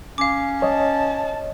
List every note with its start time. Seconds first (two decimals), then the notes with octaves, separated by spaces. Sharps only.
0.18 C#4 F5 D6
0.62 C#5 D#5 A5